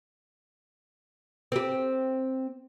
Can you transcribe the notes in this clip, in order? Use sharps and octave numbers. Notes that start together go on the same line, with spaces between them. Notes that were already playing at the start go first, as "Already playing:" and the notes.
C4 G4